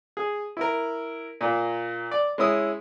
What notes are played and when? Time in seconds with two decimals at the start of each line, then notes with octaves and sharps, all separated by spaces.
0.17 G#4
0.57 E4 A#4
1.41 A#2 A#3
2.11 D5
2.38 G#3 C#4 E4 D#6